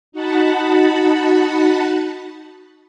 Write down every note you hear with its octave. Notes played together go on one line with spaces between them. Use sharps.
D#4 F#4 F#5 A5 B5